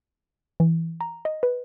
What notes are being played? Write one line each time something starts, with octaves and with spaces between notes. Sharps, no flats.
E3
A#5
D#5
B4